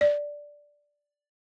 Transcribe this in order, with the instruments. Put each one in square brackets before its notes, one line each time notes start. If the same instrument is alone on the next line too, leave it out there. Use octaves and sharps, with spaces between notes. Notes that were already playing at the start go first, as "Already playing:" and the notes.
[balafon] D5